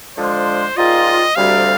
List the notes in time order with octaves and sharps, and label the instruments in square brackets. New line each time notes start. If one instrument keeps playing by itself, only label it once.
[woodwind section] D3 F3 G#3 [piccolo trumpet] C5
[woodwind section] G#2 G3 A#3 F4 [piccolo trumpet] D#5
[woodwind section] D2 C3 G3 [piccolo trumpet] F5